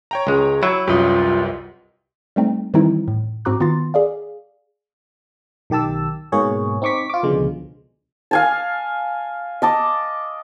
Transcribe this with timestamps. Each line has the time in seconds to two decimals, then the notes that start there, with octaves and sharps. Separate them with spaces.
0.11 C#5 G5 A#5
0.27 C#2 G#3
0.63 F#3 E4
0.88 C2 F#2 F4 G4 B4 D#5
2.36 G3 A3 C4 D#4
2.74 D#3 E3 G3 C4 D#4 E4
3.08 A2
3.45 G#2 C4 F#4 A#5 D6 F#6
3.60 D#3 B3 F4 A#5 C6 A6
3.94 G#4 D5 F5
5.70 B1 D#3 G4 A5 E6
6.32 G#2 B2 A#3 G#4 C#5
6.82 C4 D#4 C#6 D6 B6
7.10 F4 D6
7.23 C#2 B2 D3 F3 G#3
8.31 F5 G#5 A5
9.62 D#5 A5 D6